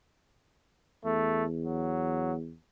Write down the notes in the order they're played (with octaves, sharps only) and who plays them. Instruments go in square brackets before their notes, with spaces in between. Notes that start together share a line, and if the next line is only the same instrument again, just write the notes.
[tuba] E2 [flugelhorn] A3
[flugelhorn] F#3